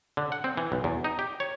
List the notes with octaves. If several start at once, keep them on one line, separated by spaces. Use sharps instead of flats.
D3
F#5
C4
E3
B1
E2
D#4
G4
C#5